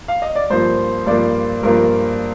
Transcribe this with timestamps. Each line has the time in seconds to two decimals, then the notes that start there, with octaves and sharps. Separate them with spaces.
0.08 F5
0.22 D#5
0.35 D5
0.50 G2 F3 A#3 C5
1.06 G2 F3 A#3 D5
1.63 G2 F3 A#3 A#4